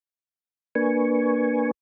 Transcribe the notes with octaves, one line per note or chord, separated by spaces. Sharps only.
A#3 D4 B4 G#5 C#6